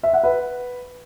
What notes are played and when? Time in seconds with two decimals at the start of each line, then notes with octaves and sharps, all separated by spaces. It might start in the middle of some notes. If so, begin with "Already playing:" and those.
0.03 E5
0.13 F#5
0.23 B4